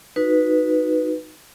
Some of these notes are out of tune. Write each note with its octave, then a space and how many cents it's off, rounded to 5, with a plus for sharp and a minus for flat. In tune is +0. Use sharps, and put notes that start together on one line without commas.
D#4 +0 F#4 -15 B4 +0